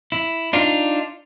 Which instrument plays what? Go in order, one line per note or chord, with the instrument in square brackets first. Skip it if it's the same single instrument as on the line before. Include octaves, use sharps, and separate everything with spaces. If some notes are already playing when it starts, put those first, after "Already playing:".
[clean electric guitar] E4
D4 D#4 F4